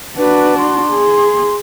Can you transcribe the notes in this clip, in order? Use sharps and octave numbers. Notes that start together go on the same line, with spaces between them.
D4 F#4 B4
C6
G#4